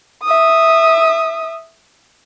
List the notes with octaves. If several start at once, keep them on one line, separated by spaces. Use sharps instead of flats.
E5 D#6